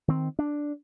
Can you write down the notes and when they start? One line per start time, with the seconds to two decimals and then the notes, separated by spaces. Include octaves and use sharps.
0.08 D#3 C4
0.39 D4